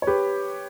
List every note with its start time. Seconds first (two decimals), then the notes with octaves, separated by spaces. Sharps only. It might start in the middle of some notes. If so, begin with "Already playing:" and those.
0.02 C#5
0.07 G4 B4